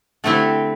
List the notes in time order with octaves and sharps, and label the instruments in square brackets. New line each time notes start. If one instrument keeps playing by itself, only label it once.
[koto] D3 A3 C4 E4 G4